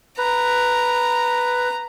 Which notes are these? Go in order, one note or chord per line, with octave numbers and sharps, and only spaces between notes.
B4 A#5